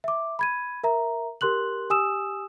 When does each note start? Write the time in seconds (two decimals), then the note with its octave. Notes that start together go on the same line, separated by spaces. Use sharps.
0.04 E5 D6
0.39 B5 G#6 D#7
0.84 A#4 E5 A#5
1.41 G4 A#4 C6 F#6 F#7
1.90 G4 G#5 D#6 E6 E7